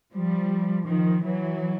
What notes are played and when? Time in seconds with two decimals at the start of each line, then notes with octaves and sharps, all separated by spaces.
0.13 F3 G3
0.87 D#3 F3
1.24 E3 F#3